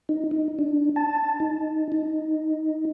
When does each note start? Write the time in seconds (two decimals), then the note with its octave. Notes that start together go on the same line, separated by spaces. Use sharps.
0.09 D#4
0.31 D#4
0.59 D4
0.96 A5
1.40 D#4
1.92 D#4